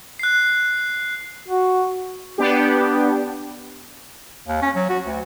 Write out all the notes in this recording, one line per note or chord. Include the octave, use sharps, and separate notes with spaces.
F#6 C7
F#4
B3 D4 G4
D#2
C#4
F#3
F#4
D2